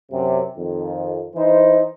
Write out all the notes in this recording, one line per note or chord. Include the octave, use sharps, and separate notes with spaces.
F#2 C3
F2 D#3
E3 D#4 C5